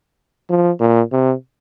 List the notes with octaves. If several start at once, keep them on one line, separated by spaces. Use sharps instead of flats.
F3
A#2
C3